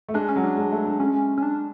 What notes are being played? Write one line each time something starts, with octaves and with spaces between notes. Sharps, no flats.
A3
G#3 D4
C#4
F#3
D4
G#3
A3
G#3
G#3 C#4
C#4
D4